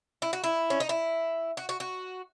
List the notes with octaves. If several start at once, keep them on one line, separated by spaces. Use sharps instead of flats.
E4
F#4
E4
C#4
D#4
E4
F#4
F#4
F#4